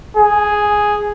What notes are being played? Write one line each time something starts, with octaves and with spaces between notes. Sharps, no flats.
G#4